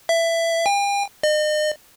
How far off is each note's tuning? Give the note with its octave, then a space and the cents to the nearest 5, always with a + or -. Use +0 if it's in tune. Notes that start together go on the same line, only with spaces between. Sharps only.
E5 +15
G5 +45
D#5 -40